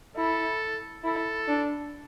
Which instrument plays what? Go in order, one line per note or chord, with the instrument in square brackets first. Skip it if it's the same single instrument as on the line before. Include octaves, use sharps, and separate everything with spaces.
[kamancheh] E4 [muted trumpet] A4
[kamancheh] E4 [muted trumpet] A4
[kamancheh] D4